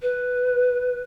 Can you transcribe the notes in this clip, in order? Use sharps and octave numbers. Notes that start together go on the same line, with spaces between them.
B4